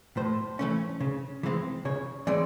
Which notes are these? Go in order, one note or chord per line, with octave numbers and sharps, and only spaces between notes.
A2 C5
E3 A3 C#4
C#3
E3 G#3 C4
C#3 C#5
E3 G#3 C4 D5